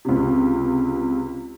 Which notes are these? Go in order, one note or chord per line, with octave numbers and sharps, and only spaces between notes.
C#2 C3